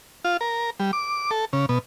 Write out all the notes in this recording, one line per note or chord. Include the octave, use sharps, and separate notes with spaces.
F4
A#4
G3
D6
A4
C#3
B2